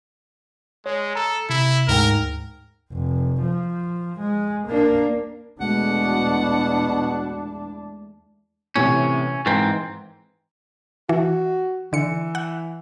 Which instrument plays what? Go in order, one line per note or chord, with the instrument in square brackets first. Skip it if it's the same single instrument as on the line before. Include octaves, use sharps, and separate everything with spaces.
[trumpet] G#3 [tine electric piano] C#5
[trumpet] A4 [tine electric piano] A#5
[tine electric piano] C3 [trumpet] E4
[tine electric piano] D2 G#2 G5 [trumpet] A#4
[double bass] F1
F3
G#3
A#3 D4
[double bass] E2 D4 [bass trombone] B2 [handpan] G#3 A3 [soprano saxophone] F#5
[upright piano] A2 C3 E3 [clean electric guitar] C#4
[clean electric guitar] G#2 C4 [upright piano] E3 A#4
[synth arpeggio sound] E3 [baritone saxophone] F#4
[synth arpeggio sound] D3 C#7 [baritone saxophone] E3
[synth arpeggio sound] F#5